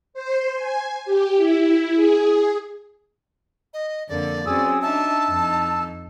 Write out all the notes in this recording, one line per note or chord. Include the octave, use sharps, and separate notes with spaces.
C5
G#5
G4
E4
G#4
D#5
F2 D3 A#3 D5
F#3 C4 C#4 G#4 D#6 E6
D4 D#4 E5 A5 E6
F2 D#4